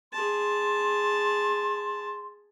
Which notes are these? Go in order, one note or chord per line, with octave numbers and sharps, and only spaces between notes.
G#4 A5 C6